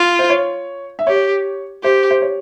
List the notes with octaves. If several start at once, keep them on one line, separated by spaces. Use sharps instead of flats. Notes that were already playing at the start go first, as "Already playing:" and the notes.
Already playing: F4
C5
C#5
E5
G4 C#5
G4 C5
C5
C#5